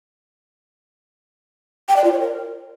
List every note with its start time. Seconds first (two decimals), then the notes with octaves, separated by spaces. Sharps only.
1.88 G5
1.96 D5
2.04 F4
2.12 C#5
2.20 A#4